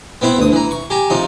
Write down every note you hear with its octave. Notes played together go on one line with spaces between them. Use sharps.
B3 C4 E4 B5
D2 D#6
E3 A#5
C#6
G4 G#5 A#5
C3 F3 D#4